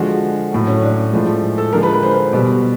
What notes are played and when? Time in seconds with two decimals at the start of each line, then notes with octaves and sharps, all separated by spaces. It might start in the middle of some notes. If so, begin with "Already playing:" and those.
Already playing: D3 F3 G#3 F#4
0.52 A2 F#3
0.67 C#4
0.82 D4
1.13 A2 F3 G#3
1.58 A4
1.73 D3 F3 G#3 A#4
1.83 B4
1.93 B4
2.03 C5
2.33 B2 G3